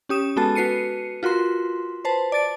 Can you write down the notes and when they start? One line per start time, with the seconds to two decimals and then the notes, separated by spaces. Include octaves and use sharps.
0.09 C#4 G4 D#6 E7
0.36 G#3 B3 F#4 A4 A5
0.55 F#4 B4 C7 C#7 D#7
1.23 F4 F#4 A#4 C6
2.05 B4 C5 A5
2.32 D5 A5 A6 D7